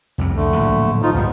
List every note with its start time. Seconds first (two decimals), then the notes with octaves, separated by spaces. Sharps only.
0.18 C2 F2 C3
0.36 D3 A3
0.53 D1 A#1 E3
1.02 F3 D#4 F4
1.14 C#2 G#2 G3 B3